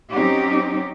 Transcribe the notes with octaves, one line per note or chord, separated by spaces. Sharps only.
F#3 C4 C#4 D#4 G4